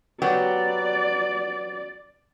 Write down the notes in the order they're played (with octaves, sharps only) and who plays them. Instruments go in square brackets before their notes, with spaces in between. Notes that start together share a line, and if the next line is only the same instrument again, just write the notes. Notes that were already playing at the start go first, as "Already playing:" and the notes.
[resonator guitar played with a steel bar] F#3 B3 G4 [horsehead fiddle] D5